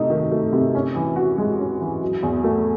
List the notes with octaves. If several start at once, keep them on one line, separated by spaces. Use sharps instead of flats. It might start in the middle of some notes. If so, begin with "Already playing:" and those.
Already playing: C3 A3 D#4
D#3
A3
C3
C#4
E3
F#4
G#3
C#4
E3
F#3
E2
A3